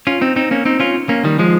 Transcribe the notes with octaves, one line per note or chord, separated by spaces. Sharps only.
C#4 F4
C4 D#4
C4 D#4
A#3 C#4
C4 D#4
C#4 F4
A#3 C#4
D#3 G3
F3 G#3